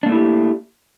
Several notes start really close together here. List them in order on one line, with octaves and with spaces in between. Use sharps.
D4 A#3 A3 E4 G4